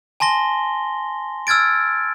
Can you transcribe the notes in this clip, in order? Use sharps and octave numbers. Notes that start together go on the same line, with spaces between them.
G#5 A5 C6 A#6 G7
E6 F6 G#6 A6 D7